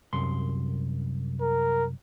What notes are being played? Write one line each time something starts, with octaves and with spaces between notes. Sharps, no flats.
C2 F#2 C6
A#4